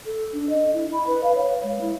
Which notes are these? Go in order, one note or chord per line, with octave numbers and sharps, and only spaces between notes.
A4
D4
D#5
E4
B5
B4
F5
C#5
G#3
E4